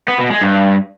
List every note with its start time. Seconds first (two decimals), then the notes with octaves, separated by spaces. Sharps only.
0.08 B3
0.19 B2
0.30 G#3
0.42 G2